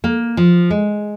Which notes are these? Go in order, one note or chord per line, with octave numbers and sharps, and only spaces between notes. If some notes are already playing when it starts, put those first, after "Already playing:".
A#3
F3
G#3